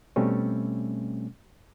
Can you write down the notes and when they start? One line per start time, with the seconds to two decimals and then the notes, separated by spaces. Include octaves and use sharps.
0.16 B2 G3 A3 C4 C#4